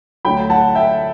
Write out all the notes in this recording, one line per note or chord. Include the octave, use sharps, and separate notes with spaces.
D2 D3 F#3 G5 B5
F#5 A5
E5 G5